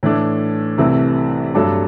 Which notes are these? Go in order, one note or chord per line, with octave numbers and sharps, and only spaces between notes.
A2 E3 A3 D4
C2 C3 E3 A3
G2 F#3 A3 D4 A4